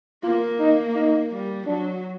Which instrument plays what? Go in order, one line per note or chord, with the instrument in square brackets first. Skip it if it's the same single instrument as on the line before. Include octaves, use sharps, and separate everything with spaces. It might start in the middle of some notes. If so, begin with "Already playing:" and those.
[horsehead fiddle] A#3 [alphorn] F4
[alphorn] D#4
D#4
[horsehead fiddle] G3
[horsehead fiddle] F#3 [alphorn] D4